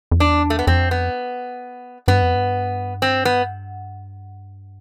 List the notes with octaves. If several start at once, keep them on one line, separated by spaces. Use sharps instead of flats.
F2
E2 D4
A3
B3
F2 C4
B3
G2 B3
F2
G2
C4
B3